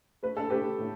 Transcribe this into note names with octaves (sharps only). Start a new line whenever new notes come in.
A3 B4
A4
A3 G4 B4
A2